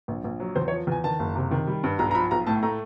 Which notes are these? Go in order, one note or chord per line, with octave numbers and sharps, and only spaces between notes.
A#1
A#1
F#3
E2 C5
C#5
F3
E2 G#5
D#3 A5
F#1
C3
D#3
G3
G2
B1 A#5
A#5
F3 B5
B1 A#5
A2 A5
A3 A#5